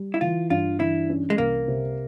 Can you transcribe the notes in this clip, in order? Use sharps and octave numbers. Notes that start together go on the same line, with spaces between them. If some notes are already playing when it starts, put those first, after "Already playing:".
Already playing: G3
E4
E3 F4
G2 F4
E3 E4
C#4
G#3
C2 A#3
C3